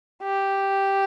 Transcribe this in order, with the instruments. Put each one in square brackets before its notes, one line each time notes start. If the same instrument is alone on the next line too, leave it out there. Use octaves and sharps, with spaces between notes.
[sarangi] G4